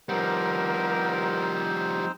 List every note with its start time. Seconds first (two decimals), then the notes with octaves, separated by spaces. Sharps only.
0.09 F3 G3 B3 C4 D#4 G4 A#4 C5